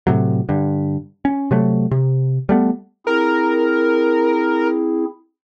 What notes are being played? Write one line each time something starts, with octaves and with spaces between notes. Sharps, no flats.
A2 C3 F#3
G2 D3
C#4
C3 F#3 A3
C3
G3 A3 B3
C4 E4 G#4 A#4